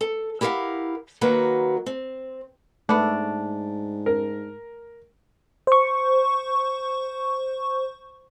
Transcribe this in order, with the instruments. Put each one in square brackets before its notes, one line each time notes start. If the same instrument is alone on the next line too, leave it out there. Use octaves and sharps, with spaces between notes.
[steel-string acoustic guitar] A4
E4 G4 A#4 D#5 F5 F#5
D#3 F#3 A#3 F#4 A#4 B4
C4
[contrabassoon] G#2 [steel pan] A3 [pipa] B3 D4
[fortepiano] A#4
[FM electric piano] C5 C#6